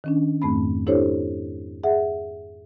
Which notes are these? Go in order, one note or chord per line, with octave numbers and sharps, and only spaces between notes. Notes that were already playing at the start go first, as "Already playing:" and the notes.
D#3 C#4 D4
F2 G#2 A3 C4 B5
D4 E4 G4 A4 C5 C#5
G#4 E5 F#5